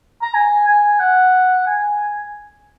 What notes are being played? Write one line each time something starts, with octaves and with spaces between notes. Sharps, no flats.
A#5
G#5
G#5
F#5
G#5